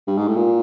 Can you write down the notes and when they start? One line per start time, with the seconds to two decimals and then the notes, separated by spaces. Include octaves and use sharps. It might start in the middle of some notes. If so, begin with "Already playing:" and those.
0.07 G2
0.17 G#2
0.28 A2
0.36 A#2